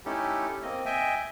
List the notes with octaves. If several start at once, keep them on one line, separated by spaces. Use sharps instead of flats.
A3 C#4 D#4 E4 G4 A4
A#3 C4 D#5
D#5 E5 G5 G#5